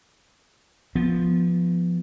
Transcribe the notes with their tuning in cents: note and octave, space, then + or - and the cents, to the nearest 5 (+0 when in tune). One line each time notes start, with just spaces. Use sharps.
F3 +0 B3 +0